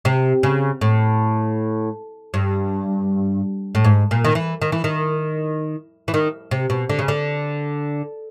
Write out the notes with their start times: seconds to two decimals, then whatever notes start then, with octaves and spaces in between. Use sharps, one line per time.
0.05 C3
0.43 C#3
0.81 A2
2.34 G2
3.75 A2
3.84 G#2
4.11 A#2
4.24 D#3
4.35 E3
4.62 D#3
4.72 E3
4.84 D#3
6.08 E3
6.14 D#3
6.51 C3
6.70 B2
6.90 D3
6.99 C#3
7.08 D3